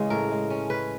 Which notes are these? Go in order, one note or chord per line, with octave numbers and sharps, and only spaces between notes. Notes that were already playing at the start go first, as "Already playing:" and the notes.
Already playing: C#3 E3 G#3
A2 A#4
G#3
C#4
C#4 B4